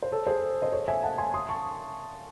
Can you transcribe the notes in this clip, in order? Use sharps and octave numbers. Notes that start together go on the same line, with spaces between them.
C5
A4 C#5
G#4 C5
C5 D#5
A4 C#5
E5 G#5
F#5 A5
G#5 C6
C6 D#6
A5 C#6